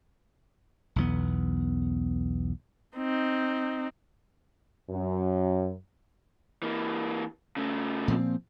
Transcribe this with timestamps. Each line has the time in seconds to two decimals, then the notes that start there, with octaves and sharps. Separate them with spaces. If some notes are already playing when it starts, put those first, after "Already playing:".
0.96 B1 E2 B3
2.97 C4 D#4
4.91 F#2
6.63 E3 A#3
7.56 C#3 A3
8.08 A#2 F3 C4